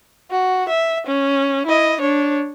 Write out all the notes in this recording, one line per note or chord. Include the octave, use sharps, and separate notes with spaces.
F#4
E5
C#4
E4 D#5
D4 C#5